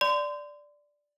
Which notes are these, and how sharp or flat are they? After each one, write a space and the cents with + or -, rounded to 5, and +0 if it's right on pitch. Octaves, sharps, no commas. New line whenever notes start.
D5 +0 C6 -35